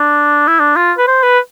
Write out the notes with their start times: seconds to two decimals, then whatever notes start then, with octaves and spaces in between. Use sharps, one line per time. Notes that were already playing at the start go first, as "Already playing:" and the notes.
Already playing: D4
0.47 E4
0.60 D4
0.76 F4
0.98 B4
1.07 C5
1.23 B4